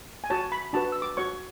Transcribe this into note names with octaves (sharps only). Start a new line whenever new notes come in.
G#5
F#4 C#5 A5
B5
D4 F#4 B4 A5
E6
D6
F#4 C#5 C#6